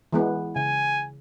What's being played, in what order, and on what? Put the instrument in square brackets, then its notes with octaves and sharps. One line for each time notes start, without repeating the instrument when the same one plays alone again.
[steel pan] E3 G#3 B3
[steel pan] C#3 [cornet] G#5